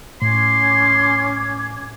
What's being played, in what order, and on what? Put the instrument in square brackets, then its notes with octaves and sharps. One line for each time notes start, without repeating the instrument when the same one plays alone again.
[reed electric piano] A2 [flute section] C#4 D6 G#6 [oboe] C6